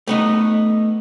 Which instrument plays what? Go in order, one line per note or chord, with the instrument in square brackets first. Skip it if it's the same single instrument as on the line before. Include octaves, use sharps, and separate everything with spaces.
[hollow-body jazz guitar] A3 B3 D#4